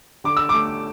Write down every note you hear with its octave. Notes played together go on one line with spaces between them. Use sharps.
D3 D6
E6
A3 D6